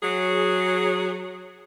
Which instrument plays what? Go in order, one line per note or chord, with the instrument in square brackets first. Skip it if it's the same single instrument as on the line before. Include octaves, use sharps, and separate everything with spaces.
[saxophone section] F#3 G#4